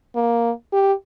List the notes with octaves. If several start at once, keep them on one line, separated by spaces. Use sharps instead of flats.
A#3
G4